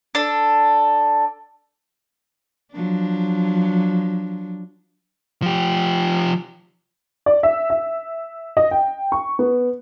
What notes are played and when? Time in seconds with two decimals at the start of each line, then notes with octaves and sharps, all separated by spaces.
0.15 D4 A4
2.73 F3 F#3 D4
5.42 F3 G4
7.26 D5
7.43 E5
7.70 E5
8.57 D#5
8.71 G5
9.12 C#6
9.39 B3